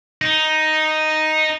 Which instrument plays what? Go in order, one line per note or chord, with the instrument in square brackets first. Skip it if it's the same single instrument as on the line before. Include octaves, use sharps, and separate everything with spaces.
[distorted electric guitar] D#4